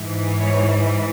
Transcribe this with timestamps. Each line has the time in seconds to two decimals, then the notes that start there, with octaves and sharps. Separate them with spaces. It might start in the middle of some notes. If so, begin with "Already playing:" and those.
Already playing: G#2 E3
0.39 C#5